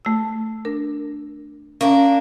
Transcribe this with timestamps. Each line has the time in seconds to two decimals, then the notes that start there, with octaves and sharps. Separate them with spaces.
0.05 A3 E6
0.65 D4 A#4
1.81 A#3 C#4 D4 A#4